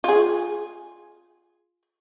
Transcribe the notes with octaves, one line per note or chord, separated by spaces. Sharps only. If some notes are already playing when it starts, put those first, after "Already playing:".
F4 G#4